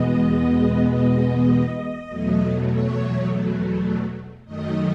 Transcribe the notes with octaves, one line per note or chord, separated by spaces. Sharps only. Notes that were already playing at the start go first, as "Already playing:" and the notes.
Already playing: E2 B2 G#3 B3 D#5
D#5
E2 B2 F#3 A3
C#5
F#2 D#3 F#3 A3 D#5